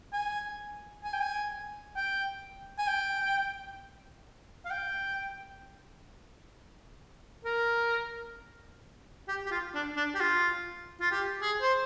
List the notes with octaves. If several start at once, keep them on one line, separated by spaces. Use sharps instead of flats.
G#5
G#5
G5
G#5
G5
G#5
G5
F5
G5
A#4
G4
G4
F4
D4
D4
G4
F4
F4
G4
G#4
C5